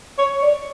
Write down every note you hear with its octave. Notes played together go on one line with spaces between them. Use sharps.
C#5
D5